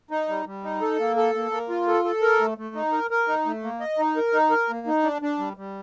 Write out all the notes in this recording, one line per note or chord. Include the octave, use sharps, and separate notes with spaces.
D#4
G3
G3
D#4
A4
A#3
A4
A#3
A#3
F4
A4
A4
A#4
A3
A3
D#4
A#4
A#4
D#4
A3
A#3
D#5
D#4
A#4
D#4
A#4
A#3
D#4
D4
D4
G3
G3